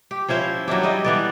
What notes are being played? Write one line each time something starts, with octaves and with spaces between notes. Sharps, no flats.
G4
F3 C#4 E4 C5
F#3 D4 E4 G4
G3 E4 D#5
E3 B3 D5